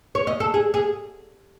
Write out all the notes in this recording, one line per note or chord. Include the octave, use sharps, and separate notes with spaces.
C#5
D#5
A4
G#4
G#4